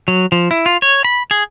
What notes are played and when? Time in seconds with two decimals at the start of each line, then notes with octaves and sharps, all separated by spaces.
0.08 F#3
0.32 F3
0.51 E4
0.66 F4
0.82 C#5
1.05 B5
1.31 G#4